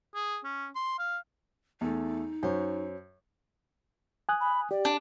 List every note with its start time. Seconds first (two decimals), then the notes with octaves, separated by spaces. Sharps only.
0.15 G#4
0.45 C#4
0.76 C6
0.99 F5
1.81 E2 A3 D#4
2.43 F#2 C5 C#5
4.29 G#5 D#6 F#6
4.41 B5
4.71 G4 D5
4.85 D4